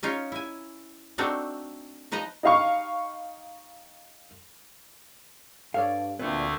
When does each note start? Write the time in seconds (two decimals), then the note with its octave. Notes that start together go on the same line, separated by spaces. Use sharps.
0.03 C#4 D#4 F4 C#5
0.32 E4 G#5
1.18 A3 C4 D4 D#4 F#4
2.12 F3 D#4 B4 D#5 A#5
2.43 D#4 G4 D#5 F5 B5 C#6
5.74 G2 A4 C#5 D5 F5
6.19 D2 A#2 A3 C4 D4 B4